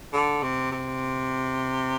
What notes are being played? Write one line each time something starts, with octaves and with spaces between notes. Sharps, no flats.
D3
C3
C3